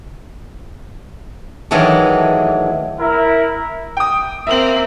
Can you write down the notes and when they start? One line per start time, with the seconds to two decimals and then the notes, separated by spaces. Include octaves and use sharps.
1.71 D#3 E3 F#3 G#3 A3 D4
3.00 E4 A#4
3.97 G5 D#6
4.47 A#3 C4 E5 F#7